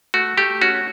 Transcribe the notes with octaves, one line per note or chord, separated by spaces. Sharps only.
A3 F#4
A3 G4
C#4 F#4